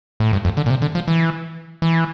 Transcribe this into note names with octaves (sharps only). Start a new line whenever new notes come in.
A2
G2
F2
D3
A#2
C3
D3
F3
E3
E3